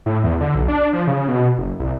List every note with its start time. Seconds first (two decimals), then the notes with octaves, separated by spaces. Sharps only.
0.06 A2
0.24 E2
0.40 D3
0.55 B1
0.68 D4
0.93 F3
1.07 C#3
1.28 B2
1.58 F#1
1.79 C2